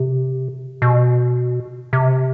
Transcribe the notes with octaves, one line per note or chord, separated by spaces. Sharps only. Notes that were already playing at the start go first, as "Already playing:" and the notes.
Already playing: C3
B2
C3